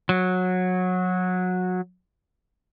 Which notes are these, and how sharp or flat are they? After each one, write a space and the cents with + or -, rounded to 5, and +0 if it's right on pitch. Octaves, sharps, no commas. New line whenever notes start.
F#3 -20